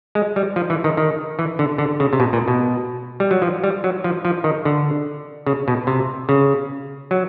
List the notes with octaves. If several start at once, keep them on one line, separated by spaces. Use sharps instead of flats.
G#3
G3
F3
E3
D#3
D#3
E3
D3
D3
C#3
C3
B2
A#2
B2
G3
F#3
F3
G3
F#3
F3
F3
D#3
D3
C#3
B2
C3
C#3
F#3